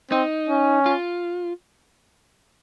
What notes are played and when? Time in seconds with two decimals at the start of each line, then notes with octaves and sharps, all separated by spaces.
0.11 C4 D#4
0.49 C#4
0.86 F4